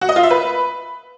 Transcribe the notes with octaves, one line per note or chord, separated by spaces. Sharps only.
F#4
D#5
F4
E5
B4